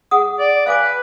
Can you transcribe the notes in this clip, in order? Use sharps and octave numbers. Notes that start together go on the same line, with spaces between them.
G#4 F#5 D#6
D5
B4 F5 G#5 D6